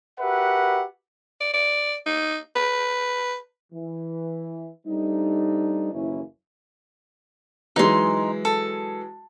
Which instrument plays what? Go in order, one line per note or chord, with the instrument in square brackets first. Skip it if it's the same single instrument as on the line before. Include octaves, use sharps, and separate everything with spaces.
[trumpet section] F#4 G4 A#4 B4 E5 F#5
[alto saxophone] D5
D5
D#4
B4
[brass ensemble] E3
G3 A3 C4 D4 D#4
F#1 D#2 E3 A#3 C#4 E4
[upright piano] E3 F#3 G#3 [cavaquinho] D#4 C6
[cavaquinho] A4